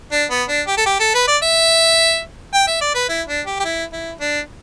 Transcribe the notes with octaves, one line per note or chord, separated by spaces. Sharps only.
D4
B3
D4
G4
A4
G4
A4
B4
D5
E5
G5
E5
D5
B4
E4
D4
G4
G4
E4
E4
D4